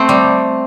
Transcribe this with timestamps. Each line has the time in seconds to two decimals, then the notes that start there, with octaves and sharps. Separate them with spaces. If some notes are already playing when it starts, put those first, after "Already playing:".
Already playing: A3 C4
0.09 G3